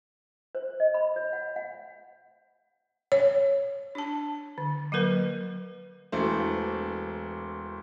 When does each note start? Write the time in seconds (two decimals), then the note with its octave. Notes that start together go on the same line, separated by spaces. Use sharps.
0.55 C5
0.80 D#5
0.94 B5
1.16 C#5
1.33 F#5
1.56 F#5
3.12 C#5
3.95 D4 A5
4.58 D3
4.92 F#3 A#3 A#4 B4
6.12 E1 E3 A3 C5